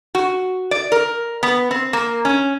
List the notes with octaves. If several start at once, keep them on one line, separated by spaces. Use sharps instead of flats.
F#4
D5
A#4
B3
C4
A#3
C#4